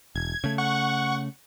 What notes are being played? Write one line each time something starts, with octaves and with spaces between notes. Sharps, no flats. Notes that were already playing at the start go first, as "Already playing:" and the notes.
E1 G#6
C#3 A3
F#5 C#6